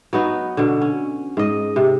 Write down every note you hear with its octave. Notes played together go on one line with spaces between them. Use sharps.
F#3 B3 D#4 F#4
B2 D3
C#4
G#2 D#5
C3